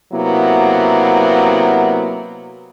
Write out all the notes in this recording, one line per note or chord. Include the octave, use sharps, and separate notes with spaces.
C3 F#3 A#3 B3 E4